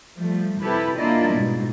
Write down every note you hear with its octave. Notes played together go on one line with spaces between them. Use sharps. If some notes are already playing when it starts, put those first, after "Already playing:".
F3 G3 A3
C3 E4 G4 A4 B4
A#3 D4 E4 F4 D5 D#5
G#2 B2